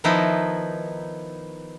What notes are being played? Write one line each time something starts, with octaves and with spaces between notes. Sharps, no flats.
D#3 F3 B3 D#4 E4